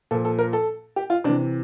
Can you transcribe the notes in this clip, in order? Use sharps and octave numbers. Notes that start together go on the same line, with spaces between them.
A#2 F3 A4
A4
A#4
A4
G4
F4
C3 E3 D4